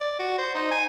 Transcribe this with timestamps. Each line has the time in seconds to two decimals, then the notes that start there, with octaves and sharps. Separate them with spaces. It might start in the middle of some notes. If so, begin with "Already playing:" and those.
0.01 D5
0.19 F#4
0.39 C5
0.55 D#4
0.72 G#5